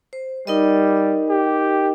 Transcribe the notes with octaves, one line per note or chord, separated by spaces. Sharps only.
C5
G3 D#4 A#4 D#5
G4